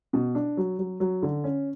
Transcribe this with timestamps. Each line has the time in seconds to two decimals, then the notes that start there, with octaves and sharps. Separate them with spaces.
0.13 B2
0.35 D4
0.57 F#3
0.79 F#3
1.00 F#3
1.22 D3
1.44 C#4